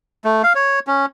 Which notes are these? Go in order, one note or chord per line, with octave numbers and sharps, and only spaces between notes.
A3
F5
C#5
C#4